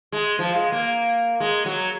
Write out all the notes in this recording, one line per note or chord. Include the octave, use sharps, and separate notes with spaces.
G#3
F3
G#3
A#3
G#3
F#3